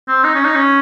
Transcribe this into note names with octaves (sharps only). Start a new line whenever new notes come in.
C4
D#4
C#4
D#4
C#4